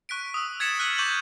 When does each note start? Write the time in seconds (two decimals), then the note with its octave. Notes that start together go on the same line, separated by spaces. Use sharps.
0.09 C#6 F#6 B6 D7
0.34 D#6 E6
0.60 E6 G#6 A6 B6 C#7 E7
0.79 F6 F#6 B6 D#7 F#7
0.98 C#6 D6 G6 F#7